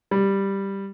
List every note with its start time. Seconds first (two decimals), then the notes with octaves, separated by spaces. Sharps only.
0.11 G3